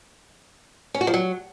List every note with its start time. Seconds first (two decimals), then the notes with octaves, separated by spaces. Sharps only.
0.94 C#4
1.01 F#4
1.07 F3
1.14 F#3